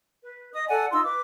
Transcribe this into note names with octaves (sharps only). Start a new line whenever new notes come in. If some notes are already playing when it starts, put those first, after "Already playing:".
B4
D#5 D#6
A4 D5 F#5 G#5
D#4 F4 C6 E6
B4 D6